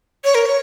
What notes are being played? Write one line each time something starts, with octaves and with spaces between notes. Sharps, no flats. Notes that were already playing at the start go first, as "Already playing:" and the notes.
C#5
A#4
C#5